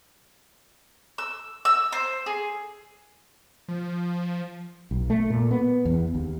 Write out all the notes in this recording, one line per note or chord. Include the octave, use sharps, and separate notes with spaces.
E6
E6
C5
G#4
F3
B1
A3
A#2
B3
E2
D#2